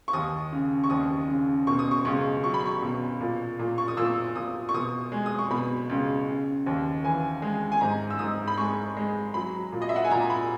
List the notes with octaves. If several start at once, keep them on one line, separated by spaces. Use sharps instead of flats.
C#6
D#2 D#6
C#3
C#6
D#2 D#6
C#3
B2 C#6
D#6
C#6
C#2 C#6
F#3 C#6
B5
C#6
B2
A#2
A#2
C#6
D#6
A#2 E6
A#2 D#6
C#6
B2 D#6
G#3
D#6
C#6
B2 B5
C#2
C#3
D#2
E3 G#5
G#3
G#5
G#2 A#5
E6
G#2 D#6
B5
G#3 C#6
G#3
F#3 B5
A#2
D#5
E5
F#5
G#5
A#2 A#5
B5